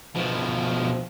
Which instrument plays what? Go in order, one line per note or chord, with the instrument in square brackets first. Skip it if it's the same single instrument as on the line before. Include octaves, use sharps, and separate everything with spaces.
[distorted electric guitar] B2 F3